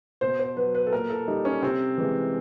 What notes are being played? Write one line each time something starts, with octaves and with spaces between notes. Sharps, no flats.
B2 C5
C5
F#3 B4
B4
A4
A#2 A#4
A4
G3 D#4
C#4
C3 C4
E3 G#3